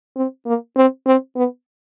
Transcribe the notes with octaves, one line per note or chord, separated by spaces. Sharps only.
C4
A#3
C4
C4
B3